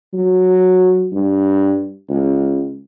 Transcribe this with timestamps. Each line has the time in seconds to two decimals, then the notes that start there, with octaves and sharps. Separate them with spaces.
0.14 F#3
1.13 G2
2.09 C#2